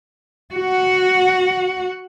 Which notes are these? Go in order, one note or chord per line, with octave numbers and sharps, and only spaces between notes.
F#4 F#5